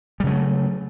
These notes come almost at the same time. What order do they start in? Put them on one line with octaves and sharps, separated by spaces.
G3 C#3 F#3 A3